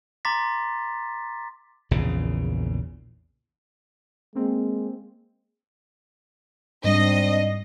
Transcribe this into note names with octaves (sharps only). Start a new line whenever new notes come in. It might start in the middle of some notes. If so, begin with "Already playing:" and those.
A#5 C6 D6 A6 B6
A#1 E2 C#3
G#3 A#3 C4
G#2 G3 C4 D4 D#5 C7